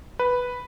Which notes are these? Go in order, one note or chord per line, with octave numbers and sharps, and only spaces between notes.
B4